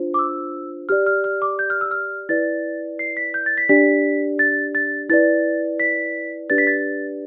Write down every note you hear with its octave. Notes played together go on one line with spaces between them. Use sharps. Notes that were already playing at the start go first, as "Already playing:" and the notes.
Already playing: D4 F4 C5
D6
E6
G4 D5 F6
F6
F6
D6
G6
F6
E6
F6
E4 B4 D5 A6
C7
B6
G6
A6
B6
D4 G4 D5 B6
A6
A6
E4 B4 D5 A6
B6
D4 G4 B4 D5 A6
B6
A6